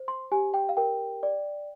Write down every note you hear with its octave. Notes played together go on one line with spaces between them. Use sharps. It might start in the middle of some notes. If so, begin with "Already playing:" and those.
Already playing: C5
C6
G4 G#5
G5
F5
A#4 G5
D5